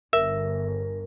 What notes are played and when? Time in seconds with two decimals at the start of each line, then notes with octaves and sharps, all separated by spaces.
0.13 G1 A#4 E5